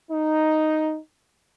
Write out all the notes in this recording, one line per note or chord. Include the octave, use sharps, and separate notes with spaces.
D#4